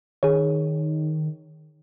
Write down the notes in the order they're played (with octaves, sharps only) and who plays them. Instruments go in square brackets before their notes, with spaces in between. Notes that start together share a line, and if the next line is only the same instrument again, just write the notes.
[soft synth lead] D#3 [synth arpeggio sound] G#4 C#5